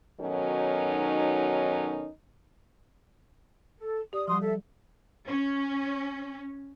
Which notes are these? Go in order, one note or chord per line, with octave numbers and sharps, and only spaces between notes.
B2 D#3 F#3 C#4 D#4 A4
A4
G4 D5 D#6
F3 G3 F#4 C6 D#6
A4 E5
C#4